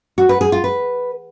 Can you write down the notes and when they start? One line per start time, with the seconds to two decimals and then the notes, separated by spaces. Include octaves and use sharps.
0.18 F#4
0.29 B4
0.41 G#4
0.52 F4
0.64 B4